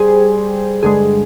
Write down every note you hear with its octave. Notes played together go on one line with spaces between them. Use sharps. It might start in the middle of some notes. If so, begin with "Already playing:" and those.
Already playing: G3 G4 G#4 C5
G2 D3 G#3 G#4